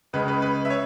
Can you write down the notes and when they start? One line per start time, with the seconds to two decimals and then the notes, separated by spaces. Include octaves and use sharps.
0.13 C#2 C#3 G#3 B4
0.28 B4
0.42 B4
0.65 E5
0.70 C#5